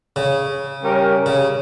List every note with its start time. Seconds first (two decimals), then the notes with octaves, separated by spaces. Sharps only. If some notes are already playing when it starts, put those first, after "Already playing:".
0.16 C#3
0.82 G3 C#4 G4 A#4
1.26 C#3